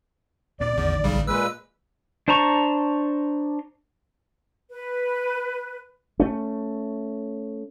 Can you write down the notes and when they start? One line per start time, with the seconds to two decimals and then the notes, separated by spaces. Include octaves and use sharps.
0.60 D2 A#2 C4 D5
0.78 A1 E2 D3 D#3
1.04 B1 C#3 G3
1.27 A#2 G#3 B4 E6
2.28 D4 C5 A5 A#5 C#6
4.70 B4
6.20 A3 C#4